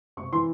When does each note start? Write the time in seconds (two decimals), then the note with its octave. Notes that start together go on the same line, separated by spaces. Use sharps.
0.17 C3 C#6
0.33 E3 C6